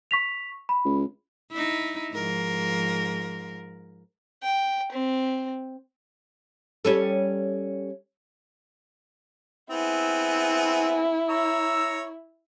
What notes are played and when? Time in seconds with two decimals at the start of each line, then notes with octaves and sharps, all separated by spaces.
0.11 C#6 B6 F7
0.69 B5
0.85 C#2
1.51 D#4 E4
2.13 G#2 F3 A#4
4.43 G5
4.92 C4
6.85 G3 C#4 A4
9.70 B3 C4 E4 G#4
11.29 C#5 A#5 E6